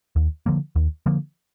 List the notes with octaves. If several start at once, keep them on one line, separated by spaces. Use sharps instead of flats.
D#2
D3 F3 A#3
D#2
D3 F3 A#3